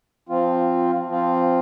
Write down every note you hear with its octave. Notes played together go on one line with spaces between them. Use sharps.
F3 C4 F4
F3 C4 F4